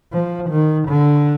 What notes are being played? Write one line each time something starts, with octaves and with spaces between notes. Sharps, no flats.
F3
D#3
D3